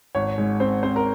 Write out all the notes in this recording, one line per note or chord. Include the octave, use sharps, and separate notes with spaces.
G#1 C#5
G#2
C4 C5
C4 C5
A#4